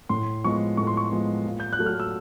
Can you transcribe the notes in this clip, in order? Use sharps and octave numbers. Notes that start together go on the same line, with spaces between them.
A2 C6
F3 G#3 B3 C#6
A2 C#6
C6
C#6
F3 G#3 B3
A#2
G6
F#6
F#3 A3
F6
E6